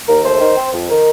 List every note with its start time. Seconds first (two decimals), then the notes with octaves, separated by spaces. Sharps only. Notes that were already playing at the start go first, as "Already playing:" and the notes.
0.08 D#2 A#4
0.25 A3 C5
0.41 D#3
0.57 C4
0.73 F2
0.90 D#3 A#4